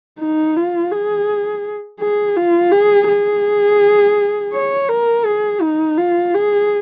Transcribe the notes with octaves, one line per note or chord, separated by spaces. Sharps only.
D#4
F4
G#4
G#4
F4
G#4
G#4
C#5
A#4
G#4
D#4
F4
G#4